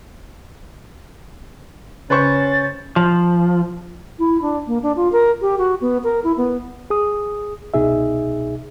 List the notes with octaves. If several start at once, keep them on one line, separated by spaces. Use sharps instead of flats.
C#3 C#4 B4 C5 C#6 A6
F3
E4
D4
A#3
D4
F4
A#4
G4
F#4
B3
A#4
E4
B3
G#4 D#6
C2 B2 D#4 G#4 E5